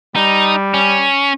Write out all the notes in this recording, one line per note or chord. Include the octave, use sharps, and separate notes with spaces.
G3 D#4
C#4